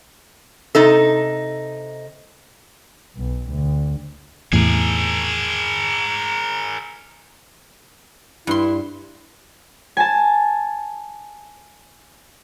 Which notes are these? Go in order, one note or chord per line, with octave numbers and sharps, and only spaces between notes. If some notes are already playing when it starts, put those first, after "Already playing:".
C3 D#4 A4
B1
D2
E2 A2 C3 G#4 A#4
G2 E4 C6
G#5 A5